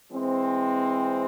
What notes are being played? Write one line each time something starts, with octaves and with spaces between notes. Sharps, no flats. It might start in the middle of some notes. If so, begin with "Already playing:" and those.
E3 G#3 C4